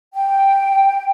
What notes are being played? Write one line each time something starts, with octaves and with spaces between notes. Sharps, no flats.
G5